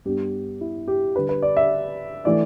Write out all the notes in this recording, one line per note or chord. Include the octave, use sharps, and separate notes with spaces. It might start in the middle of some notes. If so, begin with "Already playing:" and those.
G2 G3 B3 D4 G4
E4
G4
D3 G3 D4 B4
B4
D5
E5
E3 A3 D5